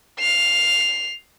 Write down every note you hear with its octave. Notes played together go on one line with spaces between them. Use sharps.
C7 F7